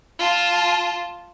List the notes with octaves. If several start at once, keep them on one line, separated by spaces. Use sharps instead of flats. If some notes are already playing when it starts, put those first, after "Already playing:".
F4 A5